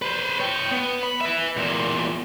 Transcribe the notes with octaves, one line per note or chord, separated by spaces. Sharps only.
B4 C5
C#5 G5
B3
B5
B4 E5
E2 A#2